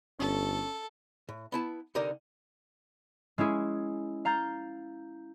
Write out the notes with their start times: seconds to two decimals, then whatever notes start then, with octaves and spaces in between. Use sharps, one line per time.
0.19 G1 C#4 A4
1.29 A2
1.52 B3 E4 A5
1.95 C2 D3 D#4 G4 A#4 D5
3.38 G#3 C#4 E4 G#4
4.25 F5 A#5 G6 A6